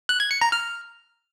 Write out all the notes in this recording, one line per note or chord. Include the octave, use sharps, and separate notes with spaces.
F#6
G#6
C#7
A#5
F6